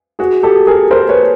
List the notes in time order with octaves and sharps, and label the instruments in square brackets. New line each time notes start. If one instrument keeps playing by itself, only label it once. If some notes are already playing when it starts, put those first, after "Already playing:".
[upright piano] F#4 G#4
G4 A4
G#4 A#4
A#4 C5
B4 C#5